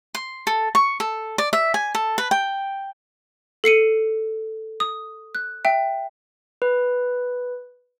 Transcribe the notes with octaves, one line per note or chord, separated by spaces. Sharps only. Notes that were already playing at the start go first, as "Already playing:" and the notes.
C6
A4
C#6
A4
D5
E5
G#5
A4
B4
G5
A4 C7 C#7 D#7
D#6
F#6
E5 G5
B4